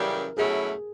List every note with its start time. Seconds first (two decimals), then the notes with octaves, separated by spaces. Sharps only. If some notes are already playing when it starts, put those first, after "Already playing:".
Already playing: F#2 C#3 E3 G3 A#4
0.37 B2 F#3 A3 C#4 E4 G#4